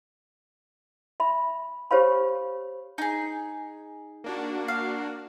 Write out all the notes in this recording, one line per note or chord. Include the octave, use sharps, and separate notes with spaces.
E5 B5
G4 C5 C#5 F5 B5
D#4 G#4
A#3 D4 F#4
F5